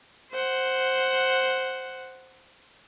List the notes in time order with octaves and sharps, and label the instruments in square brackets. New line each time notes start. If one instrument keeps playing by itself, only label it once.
[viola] C5 F#5